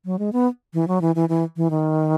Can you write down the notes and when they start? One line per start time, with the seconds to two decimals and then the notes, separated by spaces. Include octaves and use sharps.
0.05 F#3
0.19 G#3
0.33 B3
0.74 E3
0.88 F#3
1.01 E3
1.15 E3
1.29 E3
1.57 E3
1.71 D#3